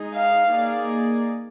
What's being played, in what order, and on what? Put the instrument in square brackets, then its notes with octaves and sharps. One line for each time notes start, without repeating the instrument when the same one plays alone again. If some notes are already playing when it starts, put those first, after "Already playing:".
Already playing: [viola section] G#3 D#4 G#4
[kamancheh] F5
[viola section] A#3 D#4 G#4 D5